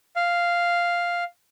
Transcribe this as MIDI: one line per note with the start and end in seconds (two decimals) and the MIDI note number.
0.16 1.24 77